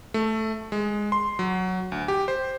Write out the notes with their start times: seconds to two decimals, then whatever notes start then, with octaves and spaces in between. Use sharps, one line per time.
0.14 A3
0.72 G#3
1.12 C6
1.39 F#3
1.92 D2
2.08 G4
2.28 C5